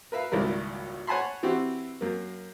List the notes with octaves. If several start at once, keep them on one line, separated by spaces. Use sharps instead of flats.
A#4 B4 E5 F5
G#1 C#2 A#2 G3 E4 A#4
C#5 F#5 G#5 A5 B5 C6
E3 C4 E4 F#4 G4
F#2 A#3